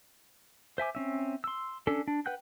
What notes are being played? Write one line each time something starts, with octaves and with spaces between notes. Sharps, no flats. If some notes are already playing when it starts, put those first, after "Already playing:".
C5 E5 G#5 D6
C4 C#4 E5
C6 E6
C#4 D4 A4
D4
B4 F#5 G5 F#6 G6